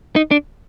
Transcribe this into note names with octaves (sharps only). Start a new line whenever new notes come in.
D#4
D4